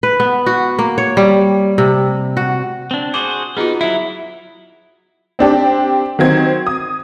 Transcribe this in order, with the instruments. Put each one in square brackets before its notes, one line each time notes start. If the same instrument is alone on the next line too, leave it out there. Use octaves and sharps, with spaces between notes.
[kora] B4
B3
F#4
A#3
C#5
G3
C3
F#4
[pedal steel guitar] C4 D4
[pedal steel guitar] F#4 G#4 C5 [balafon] D6
[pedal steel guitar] B3 D#4 [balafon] F4 F#4 G#4
[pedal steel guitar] F#3 E4 [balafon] E5
[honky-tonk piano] C4 D4 G4
D#3 F#3 C4 G#6
D#6